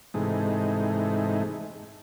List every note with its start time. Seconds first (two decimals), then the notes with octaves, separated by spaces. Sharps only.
0.14 G#2 C3 E3 G#3 A3 D#4